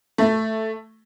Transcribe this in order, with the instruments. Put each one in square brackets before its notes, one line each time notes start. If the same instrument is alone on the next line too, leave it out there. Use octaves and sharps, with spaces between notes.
[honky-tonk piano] A3